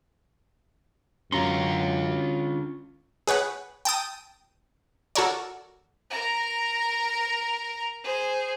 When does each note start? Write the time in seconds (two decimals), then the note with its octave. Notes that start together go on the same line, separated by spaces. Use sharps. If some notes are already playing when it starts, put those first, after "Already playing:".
1.32 F#2 D3 C#4 F4 A#5 C6
3.27 G#4 B4 C#5 F#5
3.85 G5 A5 D#6
5.15 F#4 A4 A#4 C#5 D5
6.10 A#4 A#5
8.04 G#4 C5